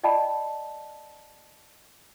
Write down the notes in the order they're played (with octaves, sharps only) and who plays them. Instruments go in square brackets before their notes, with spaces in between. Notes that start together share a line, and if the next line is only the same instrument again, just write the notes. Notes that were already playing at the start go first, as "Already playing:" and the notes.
[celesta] D5 D#5 G5 A5 B5